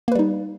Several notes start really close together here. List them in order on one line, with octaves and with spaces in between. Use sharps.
A#3 B4 G3 D#4